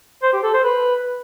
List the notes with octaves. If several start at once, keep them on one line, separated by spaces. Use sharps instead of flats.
C5
G4
A4
C5
B4